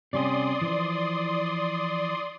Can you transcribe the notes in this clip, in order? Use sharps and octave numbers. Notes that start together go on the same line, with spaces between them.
C3 G3 C#4 D5 C6 D#6
E3 F3